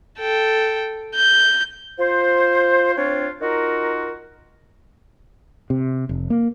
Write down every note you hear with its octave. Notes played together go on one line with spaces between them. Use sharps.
A4 G5
G6
F4 C5
C4 D4 F4 C#5
D#4 F4 F#4 A#4
C3
F1
A#3